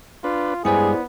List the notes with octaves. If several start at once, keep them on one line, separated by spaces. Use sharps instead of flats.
D4 F4 B4
G2 G#3 B3 E4 G#4 C5 D5